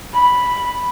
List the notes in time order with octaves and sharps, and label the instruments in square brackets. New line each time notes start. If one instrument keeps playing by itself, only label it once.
[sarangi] B5